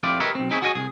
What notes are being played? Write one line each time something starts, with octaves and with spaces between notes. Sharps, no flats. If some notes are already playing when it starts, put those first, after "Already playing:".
F2 E4 F4 G4 D5
G4 A#4 B4 C#5 D#5 E5
B1 C4
C4 D#4 E4 G#4 C5 C#5
F#4 G#4 C#5 D#5 F#5 G#5
C2 G#4